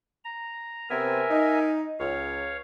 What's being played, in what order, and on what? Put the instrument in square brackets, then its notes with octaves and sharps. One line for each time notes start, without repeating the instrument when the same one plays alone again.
[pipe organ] A#5
[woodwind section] C3 B3 C4 [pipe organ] A#4 E5 G#5
[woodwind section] D#4
[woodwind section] C#2 [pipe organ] C#5 F5